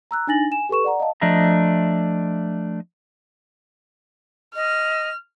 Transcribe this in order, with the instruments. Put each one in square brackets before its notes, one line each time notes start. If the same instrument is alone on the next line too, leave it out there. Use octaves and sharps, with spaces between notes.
[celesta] A#5 E6 F#6
D4 D#4 G#5 A6 A#6 F#7
G#5 E7
G4 A4 B4 C#6 E7
D5 F#5 A#5
D#5 F5 A5
[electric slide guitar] F3 A3 D4 D#5 E5 A#5
[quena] D#5 [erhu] F6